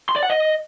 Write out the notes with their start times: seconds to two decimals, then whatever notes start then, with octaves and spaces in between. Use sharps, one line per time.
0.09 C6
0.16 D5
0.23 F#5
0.30 D#5